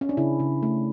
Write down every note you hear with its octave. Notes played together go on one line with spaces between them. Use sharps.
C#4
D4
C#3 E4
C#3
A3